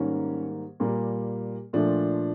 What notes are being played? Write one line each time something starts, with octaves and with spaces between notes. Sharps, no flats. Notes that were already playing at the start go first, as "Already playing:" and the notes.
Already playing: G#2 D#3 G3 A#3 C#4
A#2 G3 A#3
A#2 F3 A3 D4